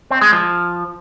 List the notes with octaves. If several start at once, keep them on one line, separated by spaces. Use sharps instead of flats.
C4
G#3
F3